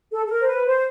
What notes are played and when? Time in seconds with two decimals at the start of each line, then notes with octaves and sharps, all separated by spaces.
0.11 A4
0.25 A4
0.29 A#4
0.41 C5
0.47 B4
0.65 C5